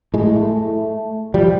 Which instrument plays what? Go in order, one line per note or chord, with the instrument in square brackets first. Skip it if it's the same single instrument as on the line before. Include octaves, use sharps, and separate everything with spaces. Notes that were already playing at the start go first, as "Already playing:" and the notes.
[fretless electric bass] A2 G#3
A3
F3 G3